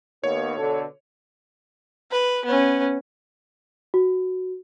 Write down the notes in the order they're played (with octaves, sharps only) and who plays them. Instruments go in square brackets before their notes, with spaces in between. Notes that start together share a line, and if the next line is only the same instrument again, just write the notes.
[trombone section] D#2 B3 [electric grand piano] C#5
[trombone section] B2 D3 A4
[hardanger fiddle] B4
B3 C#4
[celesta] F#4